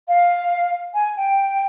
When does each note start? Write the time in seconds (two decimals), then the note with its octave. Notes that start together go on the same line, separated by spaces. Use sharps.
0.08 F5
0.94 G#5
1.16 G5